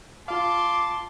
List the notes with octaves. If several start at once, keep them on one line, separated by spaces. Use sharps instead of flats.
F4 F5 A5 C6 D6